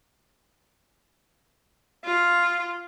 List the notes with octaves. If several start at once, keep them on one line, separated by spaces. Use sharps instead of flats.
F4